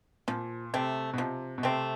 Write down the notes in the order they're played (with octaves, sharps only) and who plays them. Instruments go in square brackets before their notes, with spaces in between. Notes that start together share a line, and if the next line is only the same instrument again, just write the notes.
[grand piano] A#2 [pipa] F3
[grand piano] C3 [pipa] A3 C4
[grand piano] B2
[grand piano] C3 [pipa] F3
[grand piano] B2
[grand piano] C3 [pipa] A3 C4